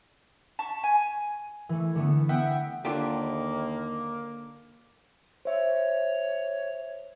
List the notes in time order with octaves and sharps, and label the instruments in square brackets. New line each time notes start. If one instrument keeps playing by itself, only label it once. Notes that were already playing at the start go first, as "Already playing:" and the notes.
[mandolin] A5 C#6 [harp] B6
[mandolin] G#5
[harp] E3 A3
D3 A3 B3
[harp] B3 [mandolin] E5 F#5 G5
[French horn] D#2 [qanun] D3 [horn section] A#3 [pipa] F4 G4
[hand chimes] C5 E5 [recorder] C#5